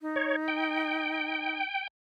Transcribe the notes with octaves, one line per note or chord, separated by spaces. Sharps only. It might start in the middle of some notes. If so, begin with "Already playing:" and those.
D#4
C#5
G5